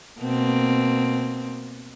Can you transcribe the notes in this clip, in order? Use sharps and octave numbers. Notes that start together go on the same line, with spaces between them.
B2 A#3 C4